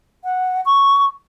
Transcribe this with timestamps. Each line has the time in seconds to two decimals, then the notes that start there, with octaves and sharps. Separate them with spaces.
0.24 F#5
0.66 C#6